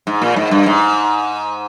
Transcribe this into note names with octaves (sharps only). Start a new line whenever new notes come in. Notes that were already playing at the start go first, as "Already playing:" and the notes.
G#2
A#2
G#2
G2
G#2